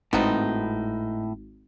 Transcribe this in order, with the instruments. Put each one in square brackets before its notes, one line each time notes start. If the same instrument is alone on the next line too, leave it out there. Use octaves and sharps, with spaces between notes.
[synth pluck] G#1 [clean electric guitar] A2 [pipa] B3 C4 D#4